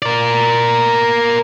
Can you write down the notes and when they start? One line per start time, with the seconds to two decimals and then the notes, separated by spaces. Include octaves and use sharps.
0.02 A#4 D5